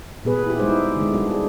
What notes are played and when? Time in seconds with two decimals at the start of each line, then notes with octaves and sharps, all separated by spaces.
0.24 A#2 B3 G#4 B4
0.46 E4 G4
0.59 G3 G#3 D#4 E4 C5
0.97 D3 G#3
1.14 G3 G#3 D4 F#4
1.30 F4 G#4